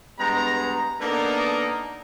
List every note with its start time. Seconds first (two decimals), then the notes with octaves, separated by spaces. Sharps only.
0.19 G2 G#3 B3 A#5
1.01 A#3 B3 D4 D#4 A4 A#4